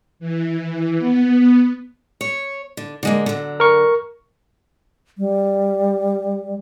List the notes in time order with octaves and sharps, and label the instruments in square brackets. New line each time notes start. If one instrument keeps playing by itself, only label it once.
[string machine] E3
B3
[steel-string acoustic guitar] C#5
D3
D3 G#3 A#3
D3 F#3
[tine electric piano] A#4 C#6
[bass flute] G3